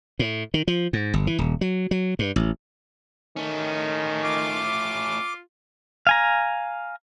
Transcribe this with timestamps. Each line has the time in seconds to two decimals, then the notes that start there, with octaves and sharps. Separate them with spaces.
0.19 A2
0.54 D#3
0.68 F3
0.93 G#2
1.14 G1
1.27 E3
1.38 D#1
1.61 F#3
1.91 F#3
2.19 G2
2.36 A1
3.37 D#3 A3 C#4
4.23 F4 D6
6.07 F5 G#5 A#5